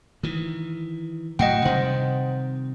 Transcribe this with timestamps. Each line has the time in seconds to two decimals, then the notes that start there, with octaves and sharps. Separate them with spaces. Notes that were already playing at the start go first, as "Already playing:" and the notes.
0.23 D#3 E3
1.39 A2 F#3 D#5 F#5 G5
1.65 C3 D#3 G3 C5